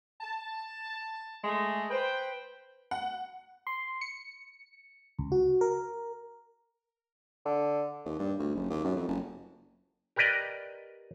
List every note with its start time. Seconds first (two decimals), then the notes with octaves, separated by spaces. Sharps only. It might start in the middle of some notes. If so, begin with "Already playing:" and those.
0.21 A5
1.44 G#3 A3
1.90 B4 C5 G5
2.91 F#5
3.67 C6
4.01 C#7
5.19 C#2
5.32 F#4
5.61 A#4
7.46 D3
8.05 D#2
8.19 G2
8.39 D2
8.55 F#1
8.70 D#2
8.85 F#2
8.96 F2
9.08 F#1
10.16 G4 A#4 B4 D5 D#5